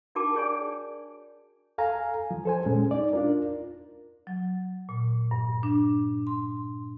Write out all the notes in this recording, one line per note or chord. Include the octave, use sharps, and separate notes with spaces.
D4 F#4 A#4 G5 A5 D6
G#4 C#5 D5 G#5
A4 F5 G#5 A#5
F3
A4 C5 G#5
A#2 G#3 C#4
D#4 D5
D4 F4 A#4
F#3
A#2
G2
D4
C6